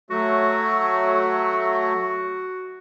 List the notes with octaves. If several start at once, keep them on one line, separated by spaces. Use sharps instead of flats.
F#3 A3 F#4